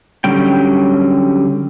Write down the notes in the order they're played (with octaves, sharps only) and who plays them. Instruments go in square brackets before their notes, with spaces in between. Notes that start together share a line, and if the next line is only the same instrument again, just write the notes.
[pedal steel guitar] D3 F#3 G3 C#4 G5